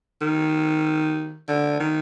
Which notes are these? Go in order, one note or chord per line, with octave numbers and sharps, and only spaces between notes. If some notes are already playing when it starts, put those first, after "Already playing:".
D#3
D3
D#3